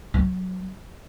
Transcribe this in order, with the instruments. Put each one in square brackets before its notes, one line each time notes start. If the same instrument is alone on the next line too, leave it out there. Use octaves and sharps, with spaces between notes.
[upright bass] F#3